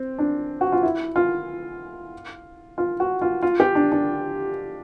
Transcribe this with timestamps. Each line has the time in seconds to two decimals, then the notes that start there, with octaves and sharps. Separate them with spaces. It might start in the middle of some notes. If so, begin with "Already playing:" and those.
Already playing: C4
0.18 D4
0.61 F#4
0.72 F4
0.83 E4
1.16 F4
2.78 F4
3.00 F#4
3.22 F4
3.43 F4
3.60 G4
3.75 D4
3.92 D4